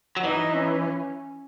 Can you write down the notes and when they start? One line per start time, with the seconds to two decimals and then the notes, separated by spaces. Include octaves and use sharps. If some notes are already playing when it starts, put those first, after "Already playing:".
0.17 F#3
0.23 E3 D#4
0.53 C#4